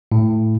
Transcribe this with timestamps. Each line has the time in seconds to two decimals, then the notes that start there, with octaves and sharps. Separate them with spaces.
0.12 A2